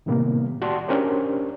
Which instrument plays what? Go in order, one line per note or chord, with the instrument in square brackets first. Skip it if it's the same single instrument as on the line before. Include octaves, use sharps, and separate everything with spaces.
[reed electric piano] A2 C3 D#3 G3 A#3 B3
F#4 G4 D5 A5 C6
C#4 D4 G4 A#4 C5 D5